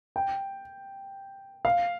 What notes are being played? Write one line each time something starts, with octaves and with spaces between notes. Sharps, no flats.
G5
F5